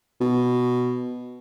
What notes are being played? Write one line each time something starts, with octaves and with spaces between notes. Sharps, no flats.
B2